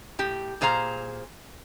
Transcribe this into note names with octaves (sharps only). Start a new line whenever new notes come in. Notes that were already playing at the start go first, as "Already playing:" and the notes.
A2 G4
A#2 G#4 C5 F5 A#5